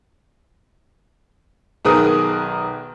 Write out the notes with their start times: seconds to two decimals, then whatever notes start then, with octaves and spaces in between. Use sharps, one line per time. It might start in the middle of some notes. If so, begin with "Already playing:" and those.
1.85 B1 D#3 G#4 A#4 B4 D#6